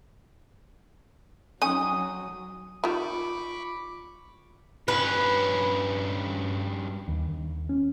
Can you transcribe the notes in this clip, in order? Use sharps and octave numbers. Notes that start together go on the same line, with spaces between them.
F#3 C#4 D#4 G#5 D#6
D#3 G3 F4 B5 C#6 D6
G2 C#4 B4
D#2
D#2
C#4